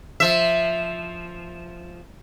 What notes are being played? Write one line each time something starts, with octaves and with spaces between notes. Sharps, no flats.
F3 E5